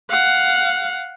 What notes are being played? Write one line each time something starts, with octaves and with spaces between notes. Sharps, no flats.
F5 F#5